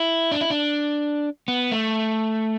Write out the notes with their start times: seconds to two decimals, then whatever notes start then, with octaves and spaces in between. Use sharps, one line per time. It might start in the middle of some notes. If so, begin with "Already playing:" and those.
Already playing: E4
0.32 D4
0.41 E4
0.50 D4
1.48 B3
1.71 A3